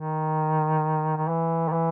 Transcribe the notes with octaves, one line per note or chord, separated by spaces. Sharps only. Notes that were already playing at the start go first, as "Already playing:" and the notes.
Already playing: D#3
D#3
E3
D#3
E3